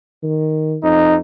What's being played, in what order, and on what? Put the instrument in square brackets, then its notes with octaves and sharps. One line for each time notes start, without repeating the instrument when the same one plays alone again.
[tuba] D#3
[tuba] F2 [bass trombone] D#4